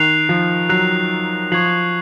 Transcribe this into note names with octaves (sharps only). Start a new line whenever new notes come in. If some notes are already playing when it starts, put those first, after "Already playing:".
Already playing: D#3 F#6 C7 F7
F3
F#3 F#6 C7 F7
F3 C#6 G#6 C7 F#7